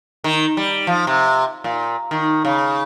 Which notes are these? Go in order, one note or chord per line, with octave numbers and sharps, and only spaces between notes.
D#3
G3
F3
C3
A#2
D#3
C#3